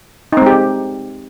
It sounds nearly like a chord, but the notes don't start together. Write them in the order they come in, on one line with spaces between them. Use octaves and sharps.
D#4 C4 G#3 G4